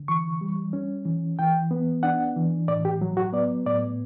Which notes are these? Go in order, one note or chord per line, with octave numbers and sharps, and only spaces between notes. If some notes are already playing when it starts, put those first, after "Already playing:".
Already playing: D3
E3 C#6
G3
C#4
E3
E3 G5
B3
D4 F#5
E3
A2 D5
G4
F#3
F#4
B3 D5
A2 D5